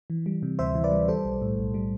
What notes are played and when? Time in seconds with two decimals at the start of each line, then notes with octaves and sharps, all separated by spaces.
0.10 E3
0.26 G3
0.43 C3
0.59 D2 C5 E5
0.75 E3
0.84 B4 D5
0.91 G3
1.08 G3 A4 C5
1.25 B1
1.42 A2
1.58 B1
1.74 G3